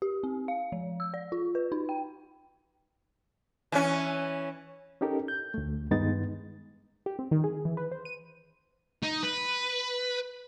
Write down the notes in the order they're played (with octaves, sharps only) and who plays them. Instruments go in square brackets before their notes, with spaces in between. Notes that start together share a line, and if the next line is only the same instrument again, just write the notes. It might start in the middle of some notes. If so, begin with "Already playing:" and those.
[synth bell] G4
C4
F5
F3
E6
D5
F4
B4
D#4
G5
[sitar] E3 C#4
[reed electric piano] C#4 D#4 G4 A4 A#4
G6
D2 A3
G2 D#3 G#3 B3 D#4 A6
[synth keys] G4
C4
D#3
G#4
E3
B4
C5
D#7
[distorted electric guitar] D#4
B4